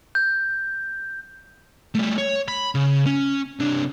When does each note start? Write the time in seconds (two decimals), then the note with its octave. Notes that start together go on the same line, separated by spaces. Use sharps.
0.15 G6
1.95 G3 A3
2.18 C#5
2.48 B5
2.75 C#3
3.06 C#4
3.60 C3 D4